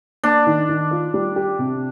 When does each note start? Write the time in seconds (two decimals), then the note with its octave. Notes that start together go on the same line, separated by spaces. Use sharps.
0.23 A#3 D4
0.47 D#3
0.69 D#3
0.91 F4
1.14 G3
1.36 G4
1.59 C3